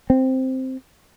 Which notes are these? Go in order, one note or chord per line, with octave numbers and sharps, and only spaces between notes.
C4